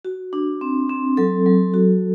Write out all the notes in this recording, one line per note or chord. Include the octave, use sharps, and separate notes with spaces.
F#4
D4
C4
C4
F#3 A4
F#3
F#4